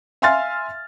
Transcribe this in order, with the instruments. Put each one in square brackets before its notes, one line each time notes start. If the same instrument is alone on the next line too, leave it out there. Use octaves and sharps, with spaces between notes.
[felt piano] E5 F5 G#5 C6 F6 A6